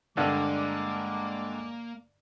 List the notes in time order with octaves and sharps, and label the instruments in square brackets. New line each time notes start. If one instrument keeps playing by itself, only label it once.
[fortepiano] G2 D3 [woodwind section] G#3 D6 [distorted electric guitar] A#3